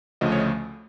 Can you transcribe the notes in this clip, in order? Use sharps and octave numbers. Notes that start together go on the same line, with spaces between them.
D2 C#3 F3 A3 D#5
C#5